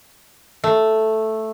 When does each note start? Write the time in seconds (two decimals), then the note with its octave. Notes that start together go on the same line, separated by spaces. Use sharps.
0.64 A3